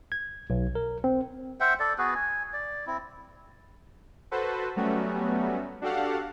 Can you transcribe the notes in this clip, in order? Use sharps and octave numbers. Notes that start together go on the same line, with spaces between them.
G#6
B1
A#4
C4
C5 E5 F#5 G5
A4 D5
B3 F#4 G#4 B4
G#5
D5
C4 E4
F#4 A4 B4 C5
F#3 G3 A3 B3 C#4 F#4
D4 F#4 G4 A4 F5 F#5